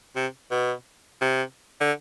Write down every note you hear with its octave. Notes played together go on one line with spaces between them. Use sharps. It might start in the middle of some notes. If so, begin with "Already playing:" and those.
C3
B2
C3
D3